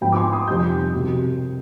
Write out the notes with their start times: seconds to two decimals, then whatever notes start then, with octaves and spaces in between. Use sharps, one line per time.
0.01 G#2 F3 B3 G5 B5
0.12 D6
0.16 G#5 C6
0.32 C6 D#6
0.47 F2 C3 G3 C4 D#4 D#6 G6
0.94 C2 B2 G3